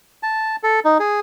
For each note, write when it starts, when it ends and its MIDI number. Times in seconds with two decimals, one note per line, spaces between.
0.23 0.56 81
0.63 0.80 69
0.85 0.98 63
1.00 1.20 68